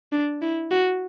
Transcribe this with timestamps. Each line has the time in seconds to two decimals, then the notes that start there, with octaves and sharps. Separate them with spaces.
0.12 D4
0.42 E4
0.71 F#4